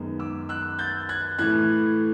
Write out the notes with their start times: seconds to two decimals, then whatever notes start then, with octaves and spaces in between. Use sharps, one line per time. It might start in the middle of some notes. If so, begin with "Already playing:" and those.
Already playing: F#2 D#3 G#3 B3
0.19 D6 E6
0.49 E6 F#6
0.79 G6 A6
1.09 F#6 G#6
1.38 A2 E3 A3 F#6 G#6